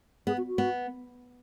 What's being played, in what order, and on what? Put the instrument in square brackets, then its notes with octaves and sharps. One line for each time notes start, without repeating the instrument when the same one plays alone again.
[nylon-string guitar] B3 [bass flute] G#4
[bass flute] F#4
F#4
[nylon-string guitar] B3